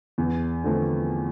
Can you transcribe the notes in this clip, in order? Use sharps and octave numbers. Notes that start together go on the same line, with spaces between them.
E2
D3 F3 A3 C4